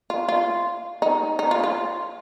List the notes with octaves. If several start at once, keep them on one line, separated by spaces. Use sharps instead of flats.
F4
F4
D#4
D#4
F4
F4